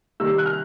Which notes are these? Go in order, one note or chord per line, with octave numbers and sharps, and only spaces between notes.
C3 D#3 G3 E6
F#6
F6